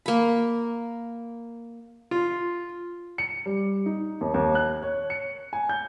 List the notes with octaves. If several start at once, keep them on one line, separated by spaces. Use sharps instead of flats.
A#3 B5
F4
C#7
G3
D#4
D#2
D#2
F#6
C#5
C#7
G#5
G6